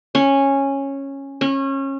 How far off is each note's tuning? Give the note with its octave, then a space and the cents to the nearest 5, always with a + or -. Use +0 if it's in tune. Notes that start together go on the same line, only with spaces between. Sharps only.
C#4 -10
C#4 -25